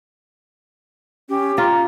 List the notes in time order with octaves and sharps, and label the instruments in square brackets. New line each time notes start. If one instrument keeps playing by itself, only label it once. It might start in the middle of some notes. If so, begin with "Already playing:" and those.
[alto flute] C#4 [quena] G4
[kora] F4 [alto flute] A#5